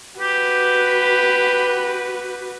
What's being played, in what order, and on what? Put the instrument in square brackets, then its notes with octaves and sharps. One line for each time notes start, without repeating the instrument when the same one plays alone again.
[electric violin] F#4 B4 [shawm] G4